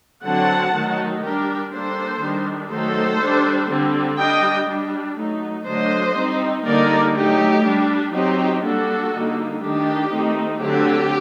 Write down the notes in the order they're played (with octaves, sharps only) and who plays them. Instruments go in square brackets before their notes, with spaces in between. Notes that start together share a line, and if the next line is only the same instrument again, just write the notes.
[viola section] D3 F#3 C4 F#5 A5
D#3 F#3 A3 D#4
G3 D4 G4 A#4
G3 A#3 D4 A4 C5
D#3 G3 D4
D#3 F#3 A3 A4 C5
G3 D4
D3 G3 C4
G3 D4 D#5 G5
G3 D4
F#3 A3 D#4
D3 F#3 A3 D4 C5 D#5
G3 C4 D#4
D3 G3 A#3 D#4 A#4 D5
F#3 A3 D#4 G4
G3 D4
F#3 C4 D#4 G4
G3 A#3 D4 F#4 A4
D3 G3 A#3 D#4
D#3 A3 D4 G4
D#3 A3 C4 D#4
D3 F#3 A3 C4 G4